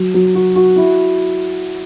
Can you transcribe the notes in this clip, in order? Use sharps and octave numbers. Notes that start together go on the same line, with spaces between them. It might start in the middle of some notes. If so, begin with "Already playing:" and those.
Already playing: F#3
F#3
F#4
F#4
E4